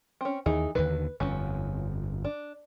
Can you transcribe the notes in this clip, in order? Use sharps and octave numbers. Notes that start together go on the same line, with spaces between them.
C4 C#4
D#2 E3 D#4 G#4
D#2 D3 D#3 B4
G1 F2 C#4
D4